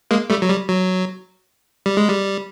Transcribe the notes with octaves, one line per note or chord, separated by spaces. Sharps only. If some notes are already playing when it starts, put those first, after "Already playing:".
G#3 A#3
G3 A3
F#3
G3
F#3
G3
G#3
G3